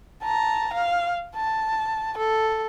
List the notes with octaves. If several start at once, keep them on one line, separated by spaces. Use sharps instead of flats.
A5 A#5
F5
A5
A4